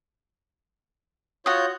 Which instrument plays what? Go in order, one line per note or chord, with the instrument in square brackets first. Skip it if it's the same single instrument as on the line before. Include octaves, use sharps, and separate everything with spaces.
[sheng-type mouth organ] F4 C#5 G6 [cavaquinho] F#4 D#6